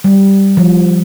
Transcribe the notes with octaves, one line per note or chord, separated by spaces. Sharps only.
G3
F3